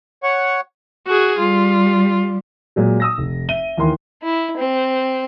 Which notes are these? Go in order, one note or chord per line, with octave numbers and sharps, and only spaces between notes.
C#5 F#5 C#6
F#4 G#4
G3 F4
A#2 F#3 G#3
D#6 E6 A#6
F1
E5 D#7 G7
D#2 E3 A#4 C6
E4
C4